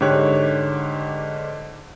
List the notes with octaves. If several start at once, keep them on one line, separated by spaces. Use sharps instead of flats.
G#2 D3 G4 C#5 F#6